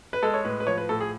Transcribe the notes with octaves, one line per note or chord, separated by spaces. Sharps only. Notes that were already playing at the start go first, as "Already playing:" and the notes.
B4
G#3 A4
C#5
A2 B4
B4
F3 C#5
B4
A2 A4
G#4